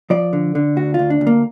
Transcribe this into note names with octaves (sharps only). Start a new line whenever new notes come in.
F3 D5
D3
D3
D2 F#4
D2 F4
D4
D2
A#3